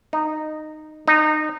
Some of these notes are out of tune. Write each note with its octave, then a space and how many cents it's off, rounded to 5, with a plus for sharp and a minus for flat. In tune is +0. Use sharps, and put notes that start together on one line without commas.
D#4 -15
D#4 -25